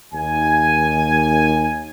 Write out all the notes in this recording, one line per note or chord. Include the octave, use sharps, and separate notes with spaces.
D#2 G#5